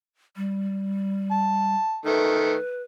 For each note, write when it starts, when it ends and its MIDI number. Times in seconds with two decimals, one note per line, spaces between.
0.36 1.75 55
1.31 2.00 81
2.06 2.55 51
2.06 2.55 57
2.06 2.82 71